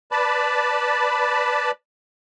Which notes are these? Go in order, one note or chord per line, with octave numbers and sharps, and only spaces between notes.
B4 D5 A5 B5